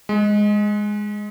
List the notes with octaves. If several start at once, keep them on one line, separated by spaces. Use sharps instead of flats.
G#3